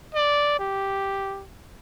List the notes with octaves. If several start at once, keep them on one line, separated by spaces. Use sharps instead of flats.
D5
G4